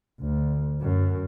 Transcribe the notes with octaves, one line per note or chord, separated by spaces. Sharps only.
D2
F#2